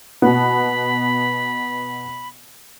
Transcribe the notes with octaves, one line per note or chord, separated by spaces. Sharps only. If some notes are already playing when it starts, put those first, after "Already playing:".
B2 B3 B5